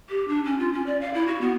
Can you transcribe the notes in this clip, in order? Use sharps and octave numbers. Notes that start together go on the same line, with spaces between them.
G4
D4
C#4
F4
C#4
D5
F5
E4
F#4
B3